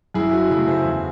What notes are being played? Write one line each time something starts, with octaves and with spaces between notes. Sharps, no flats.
F#2 E4 G#4
F#4
C#3 F#3 A3 E4 G#4
G#4 C5
E2